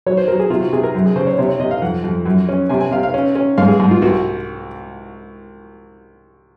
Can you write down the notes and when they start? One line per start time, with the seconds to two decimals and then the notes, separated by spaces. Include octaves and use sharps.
0.06 F#3 C#5
0.17 C5
0.28 F#3 A#4
0.40 G#4
0.50 C3 F4
0.61 F#4
0.73 C3 G#4
0.83 A#4
0.95 F#2
1.06 G#4
1.16 C#3 C5
1.27 C#5
1.38 C3 C#5
1.49 C#5
1.60 C3 D#5
1.71 F5
1.82 F2 F#5
2.04 F2
2.26 F#2
2.49 C#4
2.69 C3 G#5
2.81 G#5
2.91 C3 F5
3.03 F5
3.14 C#4
3.35 C#4
3.58 G#2 F5
3.68 G#4
3.80 G#2
3.91 F4
4.02 C2 F#4